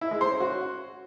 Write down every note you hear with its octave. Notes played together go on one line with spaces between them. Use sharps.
E4
G#3
C5
C#4
F#4